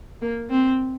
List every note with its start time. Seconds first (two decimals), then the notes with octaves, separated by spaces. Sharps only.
0.22 A#3
0.50 C4